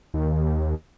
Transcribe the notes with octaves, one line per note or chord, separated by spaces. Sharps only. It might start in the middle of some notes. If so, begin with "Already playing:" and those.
D#2